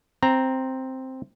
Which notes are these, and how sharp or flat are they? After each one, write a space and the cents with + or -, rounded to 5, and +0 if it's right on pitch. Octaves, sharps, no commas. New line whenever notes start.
C4 +0 A#5 +0